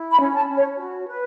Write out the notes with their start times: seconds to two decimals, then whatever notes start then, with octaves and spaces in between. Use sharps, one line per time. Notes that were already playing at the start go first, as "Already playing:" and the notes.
Already playing: E4
0.12 B5
0.20 C#4
0.33 A5
0.49 C#4
0.57 C#5
0.78 F#4
1.08 B4